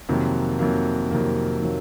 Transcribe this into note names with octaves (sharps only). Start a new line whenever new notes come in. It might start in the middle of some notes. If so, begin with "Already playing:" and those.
F2 C3 D#3 F#3 A#3
F2 C3 D#3 F#3 A#3
F2 C3 D#3 F#3 A#3
C3 D#3 F#3 A#3